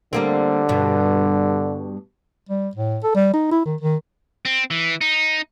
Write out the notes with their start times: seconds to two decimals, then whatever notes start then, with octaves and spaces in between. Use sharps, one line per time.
0.13 D3 G3 A#3 C4
0.69 G2 B2
2.49 G3
2.75 A2
3.04 A4
3.15 G3
3.34 D#4
3.51 E4
3.66 D#3
3.81 D#3
4.45 C4
4.71 E3
5.01 D#4